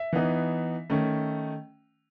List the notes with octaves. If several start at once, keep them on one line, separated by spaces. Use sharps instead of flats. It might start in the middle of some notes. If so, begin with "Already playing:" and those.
Already playing: E5
E3 B3 D#4
D#3 A3 C#4